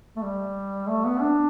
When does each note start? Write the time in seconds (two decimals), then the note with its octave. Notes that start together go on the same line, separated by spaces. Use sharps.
0.16 A3
0.22 G3
0.87 A3
1.04 B3
1.20 D4